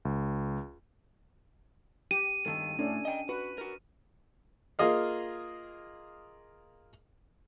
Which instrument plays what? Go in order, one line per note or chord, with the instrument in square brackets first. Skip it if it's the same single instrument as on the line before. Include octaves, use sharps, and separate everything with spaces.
[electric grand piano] C#2
[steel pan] G4 [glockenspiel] D#7
[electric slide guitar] G2 D#3 [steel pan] A4
[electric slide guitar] A2 [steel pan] C#4 D4 A4
[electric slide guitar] D#5 G5
[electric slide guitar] F#4 [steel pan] B4
[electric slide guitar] F#4 A#4
[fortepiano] A#3 F4 G#4 D#5 F5